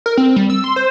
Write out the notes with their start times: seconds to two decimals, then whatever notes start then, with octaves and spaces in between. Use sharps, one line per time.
0.06 A#4
0.17 C4
0.36 G3
0.50 E6
0.64 C6
0.76 C5